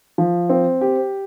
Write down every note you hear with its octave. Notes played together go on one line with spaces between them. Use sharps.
F3
C4
G4